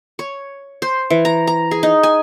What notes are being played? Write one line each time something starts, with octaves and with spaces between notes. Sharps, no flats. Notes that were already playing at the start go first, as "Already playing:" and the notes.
C#5
C5
E3
A#5
A#5
G#4
D#4
G#5